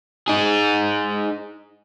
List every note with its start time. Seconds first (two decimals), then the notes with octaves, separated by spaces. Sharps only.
0.28 D#4 G#4